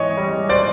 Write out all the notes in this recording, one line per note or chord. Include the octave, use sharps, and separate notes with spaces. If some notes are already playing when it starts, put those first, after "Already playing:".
Already playing: G#2 E3 C#5 D#5
G3
C5 D5